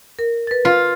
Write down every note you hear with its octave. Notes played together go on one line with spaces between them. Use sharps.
A#4
B4 A6
F4 B4